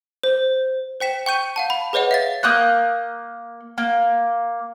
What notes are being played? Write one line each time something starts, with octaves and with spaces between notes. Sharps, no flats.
C5
C5 G5 B6 E7
G5 C#6 G6 D#7
F5 F#5 A5
B5
G#4 B4 C#5 D#5 F#5
E5 F5 A6
A#3 D#6 F#6 G6
A#3